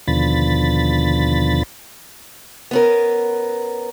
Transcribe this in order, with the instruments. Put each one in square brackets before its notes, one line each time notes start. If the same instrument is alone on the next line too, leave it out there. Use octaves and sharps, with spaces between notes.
[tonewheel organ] D#2 B2 D3 F3 B5 A6
[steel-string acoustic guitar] B3 C#4 A#4